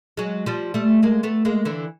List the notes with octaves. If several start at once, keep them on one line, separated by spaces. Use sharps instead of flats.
F#3 G#3
F3 G3
G3 A3
G#3 A#3
A3 B3
G#3 A#3
D3 E3